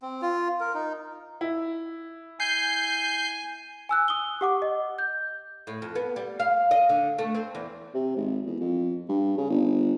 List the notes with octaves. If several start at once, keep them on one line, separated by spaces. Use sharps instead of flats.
C4
F4
A#4
D#4
E4
G#5 G6 C7
G#5 E6 F#6
D#6 G7
G4 F#5 D6
D#5
G6
A2
F2
B3
G3
F5
D#5
D3
A3
C4
E2
C3
G#1
E2
F2
G2
C#3
G1